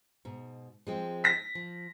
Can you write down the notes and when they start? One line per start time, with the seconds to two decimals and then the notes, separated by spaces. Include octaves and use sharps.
0.25 G#2 B2
0.87 F3 G#3 C4
1.24 A#6 B6
1.55 F3